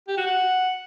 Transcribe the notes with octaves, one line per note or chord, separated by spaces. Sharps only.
G4
F#4
F#5